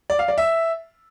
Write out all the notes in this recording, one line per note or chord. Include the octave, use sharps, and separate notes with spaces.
D5
F5
D5
E5